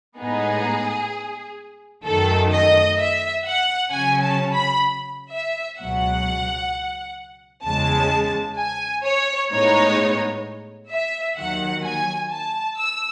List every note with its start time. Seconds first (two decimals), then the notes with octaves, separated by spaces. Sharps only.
0.18 A2 G#3 B3 D#4 G#4
2.05 F#2 D#3 A3 A4
2.52 D#5
2.98 E5
3.45 F#5
3.92 C#3 F#3 C#4 G#5
4.23 A5
4.53 B5
5.32 E5
5.78 C#2 B2 F#3 F#5
7.64 E2 C#3 G#3 A5
8.57 G#5
9.04 C#5
9.50 A2 G#3 B3 D#4 C#5
10.91 E5
11.37 D#2 D#3 F#3 F#5
11.84 G#5
12.31 A5
12.78 E6